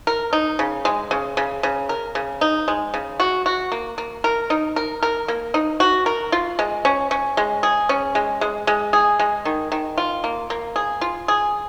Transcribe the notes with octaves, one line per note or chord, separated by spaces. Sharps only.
A#4
D#4
C#3
G#3
C#3
C#3
C#3
A#4
C#3
D#4
G#3
C#3
F#4
F#4
A#3
A#3
A#4
D#4
A#4
A#4
A#3
D#4
F#4
A#4
F4
G#3
C#4
C#4
G#3
G#4
C#4
G#3
G#3
G#3
G#4
G#3
D#3
D#3
F4
A#3
A#3
G#4
F4
G#4